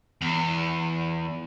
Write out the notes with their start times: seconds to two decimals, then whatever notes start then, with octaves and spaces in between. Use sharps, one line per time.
0.21 E2